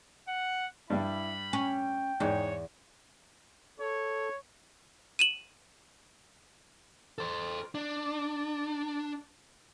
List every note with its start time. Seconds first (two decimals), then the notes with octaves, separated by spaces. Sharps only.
0.28 F#5
0.90 G2 G3 E4 B5
1.53 C#4 G5
2.20 E2 G#2 C#5
3.80 A4 C#5
5.19 D#7 E7 F#7
7.18 A4 C5
7.75 D4